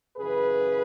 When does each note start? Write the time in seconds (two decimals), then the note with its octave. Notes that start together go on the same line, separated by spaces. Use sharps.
0.17 F#2 C#3 E3 G#4 B4